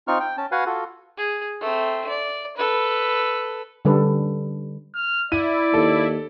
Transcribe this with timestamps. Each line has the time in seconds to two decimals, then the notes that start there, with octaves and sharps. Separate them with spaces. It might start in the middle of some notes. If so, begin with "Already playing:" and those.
0.08 C4 D#4 F4 C#6 F6
0.20 G5
0.37 C#4 A5
0.52 F#4 B4 F5 F#5 G#5
0.66 F4 F#4 A4
1.18 G#4
1.61 A3 C4
2.09 D5
2.57 A4 B4
3.85 D3 G3 C#4 D4 A4 B4
4.95 F6
5.32 E4 D5 D#7
5.74 D#2 A4